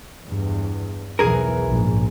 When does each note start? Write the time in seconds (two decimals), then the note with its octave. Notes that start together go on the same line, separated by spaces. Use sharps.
0.24 E2 G2
1.19 B1 E2 E3 G#4 A#4
1.65 A#1 G#2